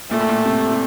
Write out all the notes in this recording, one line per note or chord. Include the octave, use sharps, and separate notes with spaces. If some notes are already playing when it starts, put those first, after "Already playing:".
A#2 A3
A2
A#2
C3
C3